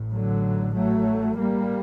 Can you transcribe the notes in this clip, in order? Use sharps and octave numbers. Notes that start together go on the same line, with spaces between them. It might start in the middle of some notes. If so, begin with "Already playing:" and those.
Already playing: A1 A2
D3 F#3
F#3 A3
G3 A#3